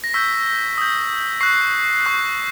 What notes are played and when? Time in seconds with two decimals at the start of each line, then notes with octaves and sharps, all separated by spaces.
0.04 A#6
0.14 C#6 E6 G6 B6
0.78 D#6 G6
1.41 C#6 F#6 C7
2.05 C#6 F#6